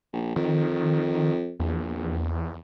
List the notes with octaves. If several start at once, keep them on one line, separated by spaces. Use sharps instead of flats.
A#1
F2 D#3
A#1 E2